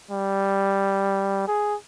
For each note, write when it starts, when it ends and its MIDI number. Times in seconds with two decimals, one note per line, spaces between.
0.10 1.43 55
1.48 1.75 68